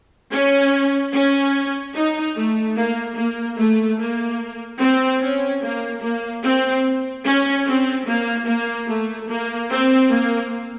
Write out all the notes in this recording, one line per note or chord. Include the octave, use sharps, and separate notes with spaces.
C#4
C#4
D#4
A3
A#3
A#3
A3
A#3
C4
C#4
A#3
A#3
C4
C#4
C4
A#3
A#3
A3
A#3
C4
A#3